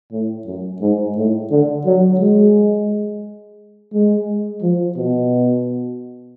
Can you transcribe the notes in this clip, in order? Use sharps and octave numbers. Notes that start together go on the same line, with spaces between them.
A2
F#2
G#2
A2
D3
F#3
G#3
G#3
F3
B2